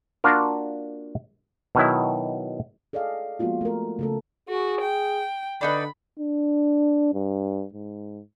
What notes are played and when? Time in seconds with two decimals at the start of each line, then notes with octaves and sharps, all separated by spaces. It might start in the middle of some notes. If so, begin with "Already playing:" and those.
0.24 A#3 D4 F4 F#4 A#4
1.75 B2 D#3 F#3 E4
2.93 G#4 A4 D5 D#5 F5
3.39 F3 G#3 A#3 B3 F4 F#4
3.61 A3 A#4
3.99 C#3 A3 A4
4.49 F#4 G#4
4.81 G5
5.61 D3 D4 D#4 B4 B5
6.19 D4
7.14 G2
7.74 G#2